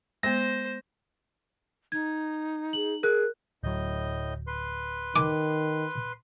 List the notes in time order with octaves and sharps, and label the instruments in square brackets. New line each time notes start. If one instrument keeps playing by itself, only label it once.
[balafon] G#3 B3 [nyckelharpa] C5 [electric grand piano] A#6
[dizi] D#4 [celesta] G#6
[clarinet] G#4 [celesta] F#7
[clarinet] G#4 [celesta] A#4 F#6
[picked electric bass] D1 F#3 [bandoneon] A2 D#5 G6
[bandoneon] B4 C6
[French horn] D#3 [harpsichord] G#5 D6